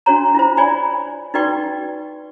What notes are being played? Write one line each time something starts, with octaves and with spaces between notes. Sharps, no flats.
D4 F#4 C#5 A#5
E4 F4 C5
C#5 D5 G#5 B5
D#4 F#4 B4 D5 G5 C#6